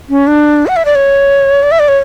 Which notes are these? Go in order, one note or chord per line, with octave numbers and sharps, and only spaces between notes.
C#4
D4
F#5
E5
D5
C#5
D5
E5
D5
C#5